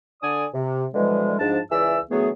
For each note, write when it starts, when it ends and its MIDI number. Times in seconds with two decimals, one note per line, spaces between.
0.23 0.46 50
0.23 0.46 74
0.23 0.46 80
0.23 0.46 87
0.54 0.85 48
0.94 1.36 47
0.94 1.36 50
0.94 1.36 52
0.94 1.36 53
0.94 1.36 55
0.94 1.36 56
1.40 1.59 44
1.40 1.59 53
1.40 1.59 62
1.40 1.59 81
1.71 1.99 37
1.71 1.99 52
1.71 1.99 68
1.71 1.99 74
1.71 1.99 76
1.71 1.99 88
2.11 2.30 50
2.11 2.30 52
2.11 2.30 54
2.11 2.30 57
2.11 2.30 59
2.11 2.30 68